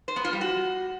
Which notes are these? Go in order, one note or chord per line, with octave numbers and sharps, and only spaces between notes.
C5
B3
F4
G3
F#4